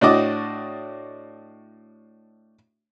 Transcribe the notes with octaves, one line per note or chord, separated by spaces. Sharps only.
A2 D4 F#4 D#5 D6